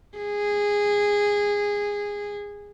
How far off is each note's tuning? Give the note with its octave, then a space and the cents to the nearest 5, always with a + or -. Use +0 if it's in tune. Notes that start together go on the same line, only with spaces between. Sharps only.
G#4 -15